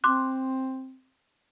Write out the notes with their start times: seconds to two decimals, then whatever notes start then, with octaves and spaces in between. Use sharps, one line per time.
0.04 C4 C6 D6 F#6